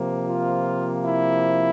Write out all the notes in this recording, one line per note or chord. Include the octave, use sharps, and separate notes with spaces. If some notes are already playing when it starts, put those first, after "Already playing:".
Already playing: C3 F3 A#3
F4
E4